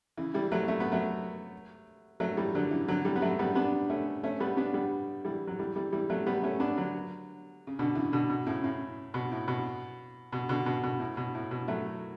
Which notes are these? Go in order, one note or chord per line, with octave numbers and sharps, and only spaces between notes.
C#3 E3
E3 G3
F#3 A3
A3
B3
F#3 A3
F#3 A3
E3 G3
D3 F#3
C#3 E3
D3 F#3
E3 G3
B3
F#3 A3
G3 B3
B3 D4
A3 C#4
A3 C#4
G3 B3
B3 D4
G3 B3
E3 G3
F#3
E3 G3
E3 G3
E3 G3
F#3 A3
G3 B3
A3 C#4
B3 D4
D3 F#3
C#3
B2 D3
C#3 E3
B2 D3
B2
A2 C#3
A2 C#3
B2
A2
B2
B2
B2 D3
B2
B2
A2
B2
A2
B2
F#3 A3